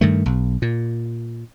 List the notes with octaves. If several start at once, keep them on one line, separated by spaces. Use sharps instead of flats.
G2 D#3 A3
B1
A#2